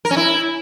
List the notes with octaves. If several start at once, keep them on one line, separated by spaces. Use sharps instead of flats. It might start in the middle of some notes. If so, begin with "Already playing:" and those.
A#4
C#4
E4